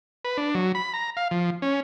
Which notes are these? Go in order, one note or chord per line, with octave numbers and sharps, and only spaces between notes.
B4
D4
F#3
B5
A#5
F5
F3
C#4